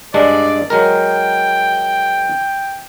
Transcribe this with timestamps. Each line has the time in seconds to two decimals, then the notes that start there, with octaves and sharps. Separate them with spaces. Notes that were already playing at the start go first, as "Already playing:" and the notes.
0.14 G2 G#3 D4 D5
0.70 F#3 G#3 A#4 G5